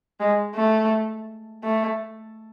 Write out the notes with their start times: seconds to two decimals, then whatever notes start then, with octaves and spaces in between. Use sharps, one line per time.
0.20 G#3
0.56 A3
1.64 A3